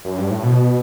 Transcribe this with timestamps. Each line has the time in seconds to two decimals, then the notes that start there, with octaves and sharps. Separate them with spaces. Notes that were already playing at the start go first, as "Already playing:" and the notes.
0.05 F#2
0.18 G2
0.30 A2
0.43 B2